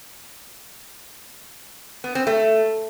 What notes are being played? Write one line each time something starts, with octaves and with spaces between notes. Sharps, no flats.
B3
C4
A3